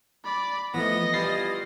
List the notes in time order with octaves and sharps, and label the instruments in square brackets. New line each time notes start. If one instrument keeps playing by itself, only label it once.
[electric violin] D5 B5
[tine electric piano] E3 F3 A3 [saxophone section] B3 [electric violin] D#5 A#6
[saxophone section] E3 G3 F4 [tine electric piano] B4 A6 C7